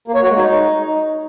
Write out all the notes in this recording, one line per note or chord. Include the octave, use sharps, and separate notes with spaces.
A#3
C#5
F#4
G#3
D#4